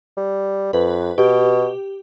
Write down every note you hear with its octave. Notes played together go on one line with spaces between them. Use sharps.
G3
F2 B4
B2 G4